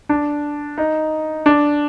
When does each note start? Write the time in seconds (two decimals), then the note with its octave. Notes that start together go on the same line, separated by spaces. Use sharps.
0.09 D4
0.78 D#4
1.46 D4